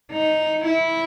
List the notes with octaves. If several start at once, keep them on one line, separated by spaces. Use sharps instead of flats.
D#4
E4